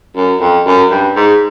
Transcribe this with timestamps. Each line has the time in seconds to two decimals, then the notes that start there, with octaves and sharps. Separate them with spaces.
0.16 F#2
0.41 F2
0.66 F#2
0.90 G2
1.16 G#2